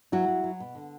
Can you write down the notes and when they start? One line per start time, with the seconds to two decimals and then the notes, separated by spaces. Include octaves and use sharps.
0.12 F#3 E4 F#4
0.28 F#3
0.44 F#3
0.60 B2
0.75 D3